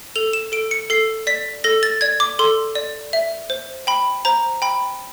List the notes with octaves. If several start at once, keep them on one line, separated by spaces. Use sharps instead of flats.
A4 F7
E7
A4 D7
C#7
A4 C7
D5 B6
A4 A#6
A6
D5 G#6
D6
A4 C6
D5
E5
C5
G5 B5
C5 A#5
G5 B5